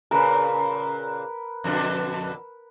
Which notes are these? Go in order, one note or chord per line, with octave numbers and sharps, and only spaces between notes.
A#2 C#3 A#4 B4
F2 B2 D3